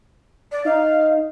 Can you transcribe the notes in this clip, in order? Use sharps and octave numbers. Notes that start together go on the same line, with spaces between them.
D5
D#4 F5